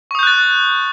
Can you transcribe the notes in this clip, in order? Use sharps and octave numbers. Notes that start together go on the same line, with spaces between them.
C#6 D#6 F#6 G6 A6